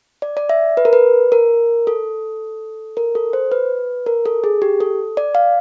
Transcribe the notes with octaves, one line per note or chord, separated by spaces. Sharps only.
D5
D5
E5
B4
A#4
B4
A#4
A4
A#4
A4
C5
B4
A#4
A4
G#4
G4
A4
D5
F5